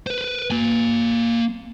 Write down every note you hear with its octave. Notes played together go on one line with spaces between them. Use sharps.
B4 C5
A#3 G#5